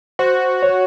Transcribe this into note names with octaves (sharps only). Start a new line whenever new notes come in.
F#4 C5
C#5